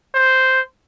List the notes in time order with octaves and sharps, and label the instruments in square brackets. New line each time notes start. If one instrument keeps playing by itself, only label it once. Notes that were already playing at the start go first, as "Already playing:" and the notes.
[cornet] C5